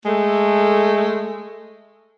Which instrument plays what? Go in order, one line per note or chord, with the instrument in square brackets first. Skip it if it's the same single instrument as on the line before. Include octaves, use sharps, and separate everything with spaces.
[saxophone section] G#3 A3